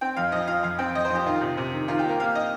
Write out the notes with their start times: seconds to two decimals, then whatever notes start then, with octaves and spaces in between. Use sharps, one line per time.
0.01 C4 G5
0.16 F2 F5
0.32 F3 D#5
0.47 F3 F5
0.63 F2 F5
0.79 C4 G5
0.95 F2 D#5
1.05 C5
1.10 F3 G4
1.26 D#3 F4
1.41 C3
1.57 C3
1.73 D#3
1.88 D#3 F4
1.99 G4
2.04 A#3 A#4
2.20 A#3 F5
2.35 D#5